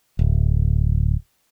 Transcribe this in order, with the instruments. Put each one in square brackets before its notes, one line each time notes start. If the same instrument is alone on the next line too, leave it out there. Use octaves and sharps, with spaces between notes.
[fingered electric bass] D1